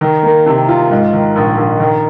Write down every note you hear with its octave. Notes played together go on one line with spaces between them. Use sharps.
D#3
A#3
C3
F4
G#2
D#3
A#1
A#1
D#3